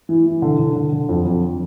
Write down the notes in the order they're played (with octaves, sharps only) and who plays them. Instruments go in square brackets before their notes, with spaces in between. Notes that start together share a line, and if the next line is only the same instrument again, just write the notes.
[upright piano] E3
E3
D3
D3
D3
D3
F2
F2